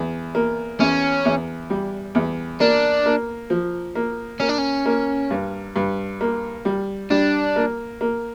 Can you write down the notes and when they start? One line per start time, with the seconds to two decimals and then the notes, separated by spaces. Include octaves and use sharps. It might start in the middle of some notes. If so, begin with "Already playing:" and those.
Already playing: E2
0.35 A#3
0.80 E2 C#4
1.25 E2
1.70 G3
2.15 E2
2.60 A#3 D4
3.06 A#3
3.50 F3
3.95 A#3
4.40 A#3 C#4
4.49 D4
4.58 C#4
4.86 A#3
5.31 G2
5.76 G2
6.21 A#3
6.65 G3
7.11 G3 D4
7.56 A#3
8.01 A#3